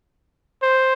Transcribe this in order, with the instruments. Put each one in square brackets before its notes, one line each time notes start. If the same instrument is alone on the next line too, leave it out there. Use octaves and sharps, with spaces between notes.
[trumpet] C5